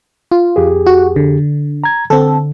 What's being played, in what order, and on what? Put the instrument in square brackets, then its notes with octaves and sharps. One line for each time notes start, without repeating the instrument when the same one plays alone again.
[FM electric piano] F4
[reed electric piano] F2 G4 G#4
[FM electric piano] F#4
D3
[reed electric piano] A#5 G#6
[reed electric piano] D3 [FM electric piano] C4 A4